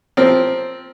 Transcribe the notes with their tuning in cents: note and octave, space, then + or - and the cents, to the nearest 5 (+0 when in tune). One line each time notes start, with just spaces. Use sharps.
F3 +0 C4 -5 A#4 +0